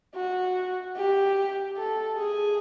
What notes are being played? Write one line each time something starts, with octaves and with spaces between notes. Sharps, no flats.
F#4
G4
A4
G#4